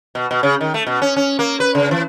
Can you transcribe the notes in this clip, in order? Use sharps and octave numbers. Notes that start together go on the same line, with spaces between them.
B2
B2
C#3
D#3
A3
B2
C#4
C#4
A#3
B4
C#3
E3